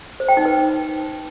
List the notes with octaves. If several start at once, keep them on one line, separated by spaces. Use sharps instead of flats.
C5
G5
D#4
B4